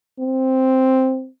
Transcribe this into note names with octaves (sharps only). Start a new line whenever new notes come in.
C4